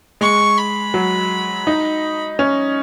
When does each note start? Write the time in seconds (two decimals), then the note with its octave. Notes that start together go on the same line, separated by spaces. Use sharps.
0.21 G#3 C#6
0.58 B5
0.94 F#3
1.67 D#4
2.39 C#4